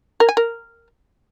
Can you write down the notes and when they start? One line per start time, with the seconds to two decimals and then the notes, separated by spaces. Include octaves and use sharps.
0.20 A#4
0.29 G#5
0.37 A#4